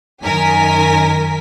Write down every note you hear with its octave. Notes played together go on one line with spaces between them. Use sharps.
F#2 D#3 A#4 G#5 B6